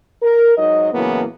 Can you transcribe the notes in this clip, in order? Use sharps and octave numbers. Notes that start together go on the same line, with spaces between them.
A#4
G#2 F#3 D#4 D#5
A2 C#3 E3 F#3 A#3 B3